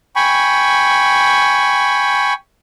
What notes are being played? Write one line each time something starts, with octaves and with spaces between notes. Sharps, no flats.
G5 G#5 B5 C#6